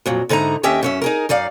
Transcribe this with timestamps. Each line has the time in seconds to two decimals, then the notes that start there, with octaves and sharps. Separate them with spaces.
0.06 F2 A#2 F#3
0.29 G#2 D3 D#4 E4 A#5
0.63 D#2 C#4 G4 D#5 E5 G5
0.83 F#2 C#4 E5
1.02 D#4 G#4 A#4
1.29 F#2 D#4 D5 F5